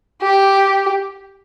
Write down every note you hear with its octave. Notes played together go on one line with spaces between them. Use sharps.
G4